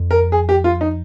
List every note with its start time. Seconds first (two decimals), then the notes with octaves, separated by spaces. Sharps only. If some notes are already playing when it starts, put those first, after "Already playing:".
Already playing: F2
0.11 A#4
0.32 G#4
0.49 G4
0.64 F4
0.81 D#4